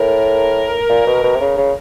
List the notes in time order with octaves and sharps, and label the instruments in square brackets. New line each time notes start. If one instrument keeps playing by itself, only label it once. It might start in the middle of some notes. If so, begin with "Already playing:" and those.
Already playing: [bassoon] A2 [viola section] A#4
[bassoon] A#2
B2
B2
C3
C#3
C#3